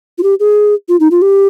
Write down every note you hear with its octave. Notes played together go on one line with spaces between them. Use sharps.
F4
G4
G#4
F4
D#4
F4
G4